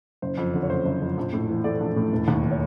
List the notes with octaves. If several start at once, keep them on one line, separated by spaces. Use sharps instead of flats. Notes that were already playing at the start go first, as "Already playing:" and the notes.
F#1 C5
F2
D3
C#5
F#1 C5
F#1
F2
A#1
A2
E3
A3 D5
A#1
A2
E1
D#2
D#3
C#5